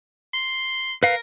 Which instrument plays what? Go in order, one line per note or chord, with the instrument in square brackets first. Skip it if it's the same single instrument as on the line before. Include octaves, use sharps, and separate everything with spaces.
[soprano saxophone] C6
[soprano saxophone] A#4 [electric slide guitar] B4 F5